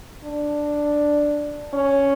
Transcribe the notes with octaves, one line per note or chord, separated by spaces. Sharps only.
D4
C#4